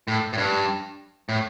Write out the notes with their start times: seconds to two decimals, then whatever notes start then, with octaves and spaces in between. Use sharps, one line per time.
0.08 A2
0.33 A2
0.37 G2
1.29 A2